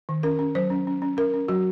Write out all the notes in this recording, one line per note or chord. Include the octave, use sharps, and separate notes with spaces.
D#3
C#4 A#4
C#4
F#3 C5
C#4
C#4
C#4
C#4 A#4
C#4
F#3 F#4